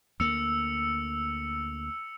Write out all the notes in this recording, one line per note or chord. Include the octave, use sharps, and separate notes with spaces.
D2 A#3 E6 C#7 F7